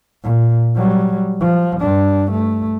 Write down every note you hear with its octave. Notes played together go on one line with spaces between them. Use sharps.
A#2
F#3 G3
F3
G2 D4
A3